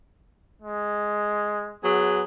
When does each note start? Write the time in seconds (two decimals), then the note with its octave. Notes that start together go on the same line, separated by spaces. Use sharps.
0.62 G#3
1.84 F#3 B3 G#4